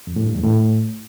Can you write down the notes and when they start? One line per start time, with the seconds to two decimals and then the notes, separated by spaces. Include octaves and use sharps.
0.07 F2
0.16 A2
0.26 G2
0.35 E2
0.44 A2